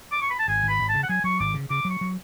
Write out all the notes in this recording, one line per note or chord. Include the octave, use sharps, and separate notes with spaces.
D6
C#6
B5
A5
G#1 G#5
G#1
B5
G#1
A5
C#3
F#5
F#3 G#5
F#3 C#6
G#1 D6
C#3
C#3 D6
F#3
C#6
F#3